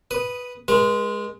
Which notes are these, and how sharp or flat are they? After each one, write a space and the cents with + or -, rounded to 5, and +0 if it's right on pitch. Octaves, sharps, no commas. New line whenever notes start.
B4 +0 D#6 +0
G#3 +0 B4 -40